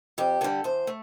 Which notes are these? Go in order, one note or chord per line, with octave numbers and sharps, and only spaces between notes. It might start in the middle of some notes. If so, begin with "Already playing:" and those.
F2 G4
D3 G3 A4
E2 C5
A3